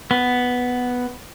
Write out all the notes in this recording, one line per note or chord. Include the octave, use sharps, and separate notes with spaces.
B3